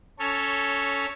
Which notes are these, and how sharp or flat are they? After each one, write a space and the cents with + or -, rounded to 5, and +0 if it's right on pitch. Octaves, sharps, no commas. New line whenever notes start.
C#4 +15 A4 +0 C#5 +0